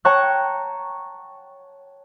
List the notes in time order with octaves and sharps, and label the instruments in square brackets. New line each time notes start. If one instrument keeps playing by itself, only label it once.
[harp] C#5 G5 A5 A#5 C#6 F#6